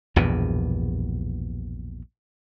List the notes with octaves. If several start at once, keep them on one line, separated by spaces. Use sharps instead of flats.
A#1 E2 G2 B2